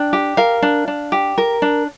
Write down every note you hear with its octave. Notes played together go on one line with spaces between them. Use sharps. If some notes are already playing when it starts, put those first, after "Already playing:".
Already playing: D4 G5
G4
A#4 F5
D4
D4
G4
A#4
D4